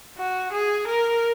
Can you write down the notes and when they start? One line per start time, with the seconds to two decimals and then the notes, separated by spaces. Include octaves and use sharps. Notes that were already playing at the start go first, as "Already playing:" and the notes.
0.18 F#4
0.53 G#4
0.88 A#4